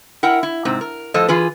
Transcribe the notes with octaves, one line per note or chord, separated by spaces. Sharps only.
E4 A#4 F#5 G5
E4
G#2 C3 C4
A#4
A2 F3 A4 C5 D#5
E3 F4 G#4 B4